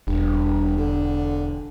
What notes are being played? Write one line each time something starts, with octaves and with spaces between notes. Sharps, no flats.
E1 G2
D3